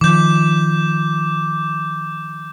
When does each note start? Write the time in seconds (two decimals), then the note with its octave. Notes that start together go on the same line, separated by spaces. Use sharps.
0.01 D#3 F3 D6 G6